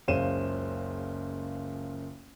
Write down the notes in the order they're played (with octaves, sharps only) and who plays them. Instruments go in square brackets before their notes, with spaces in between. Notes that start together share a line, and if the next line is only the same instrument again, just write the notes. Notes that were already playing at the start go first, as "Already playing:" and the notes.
[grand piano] F#1 C#2 C#3 C5 D#7 E7